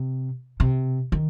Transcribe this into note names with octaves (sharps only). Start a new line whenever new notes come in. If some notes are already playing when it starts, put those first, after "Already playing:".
Already playing: C3
C3
D#3